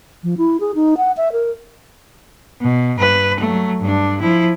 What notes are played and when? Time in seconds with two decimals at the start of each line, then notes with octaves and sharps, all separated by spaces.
0.24 F3
0.38 E4
0.60 G#4
0.75 D#4
0.97 F#5
1.17 E5
1.33 A#4
2.61 B2
2.99 G2 B4
3.40 F#3 A3
3.81 G2 D4
4.21 F3 E4